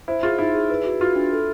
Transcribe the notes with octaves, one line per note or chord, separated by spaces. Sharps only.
E4 C5
F4 G#4
D#4 E4
G#4
B4
F#4
F4 F#4
D4
A4